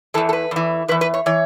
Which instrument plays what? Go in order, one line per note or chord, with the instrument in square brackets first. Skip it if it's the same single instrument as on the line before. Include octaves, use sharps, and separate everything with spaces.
[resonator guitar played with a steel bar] E3 A4
E2
A4
B4
E2 E3
E2 E3 B4
B4
C#5
E3 C#5